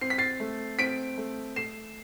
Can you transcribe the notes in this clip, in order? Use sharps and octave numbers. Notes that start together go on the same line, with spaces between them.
C4 C7
B6
A6 C7
A3
C4 B6 D7
A3
A3 C7 E7